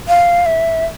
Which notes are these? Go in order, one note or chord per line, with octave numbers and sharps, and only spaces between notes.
F5
E5